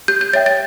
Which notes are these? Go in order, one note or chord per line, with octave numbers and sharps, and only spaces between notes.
G4 G6
G6
C#5 E5 G5 A6
A6